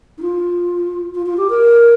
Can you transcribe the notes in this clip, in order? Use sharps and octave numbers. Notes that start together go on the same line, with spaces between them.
D#4
F4
F4
F4
G4
A#4